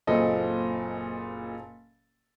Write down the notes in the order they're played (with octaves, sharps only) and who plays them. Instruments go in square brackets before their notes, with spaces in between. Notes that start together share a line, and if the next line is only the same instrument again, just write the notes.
[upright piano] F#1 A#2 C4 A4 D#5